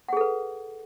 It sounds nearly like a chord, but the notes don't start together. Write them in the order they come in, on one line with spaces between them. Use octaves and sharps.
F#5 G#4 A4 B4